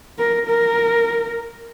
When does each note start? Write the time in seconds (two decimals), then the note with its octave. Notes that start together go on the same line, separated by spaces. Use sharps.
0.18 A#4
0.46 A#4